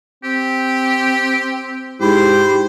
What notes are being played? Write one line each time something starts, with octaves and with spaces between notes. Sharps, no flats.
C4 G4
G#2 E4 G4 C5